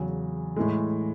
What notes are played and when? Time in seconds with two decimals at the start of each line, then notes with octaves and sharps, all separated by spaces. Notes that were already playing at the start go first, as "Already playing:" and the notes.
Already playing: E2 C#3 F#3
0.56 A2 E3 G#3